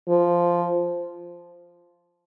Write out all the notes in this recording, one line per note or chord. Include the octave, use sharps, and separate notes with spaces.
F3